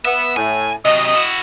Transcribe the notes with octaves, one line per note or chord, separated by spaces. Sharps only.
B3 E5
A2 G#5
C3 F#3 D#5
E4 F#4